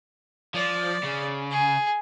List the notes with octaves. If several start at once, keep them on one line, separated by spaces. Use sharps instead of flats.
F3 D5
C#3
G#4